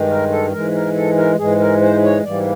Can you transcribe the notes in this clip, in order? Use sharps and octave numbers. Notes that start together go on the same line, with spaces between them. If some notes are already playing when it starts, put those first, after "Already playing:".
Already playing: G2 D#3 G#3
A#4
A4
G#2 E3 G#3 A#4
A#4
A4
A#4
G#2 E3 G#3 G#4
A#4
C5
C#5
G#2 E3 G3 A#3 D5